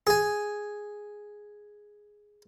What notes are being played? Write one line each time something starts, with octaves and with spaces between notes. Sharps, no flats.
G#4 G#5